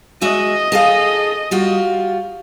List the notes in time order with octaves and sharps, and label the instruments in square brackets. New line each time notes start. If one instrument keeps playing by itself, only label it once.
[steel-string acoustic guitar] G#3 F#4 E5 [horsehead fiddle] D#5
[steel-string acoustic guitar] G#4 A4 F5
G3 F4 F#4